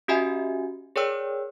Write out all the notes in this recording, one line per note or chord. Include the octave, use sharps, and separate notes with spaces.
C#4 F#4 G4 D#5 E5 G#5
G#4 A#4 C#5 D5 G5 E6